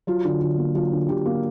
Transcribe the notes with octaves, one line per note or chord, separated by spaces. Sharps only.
F#3 F4
D3
D3 F4
A#3
F#3 F4
D3
D3 G4
A#3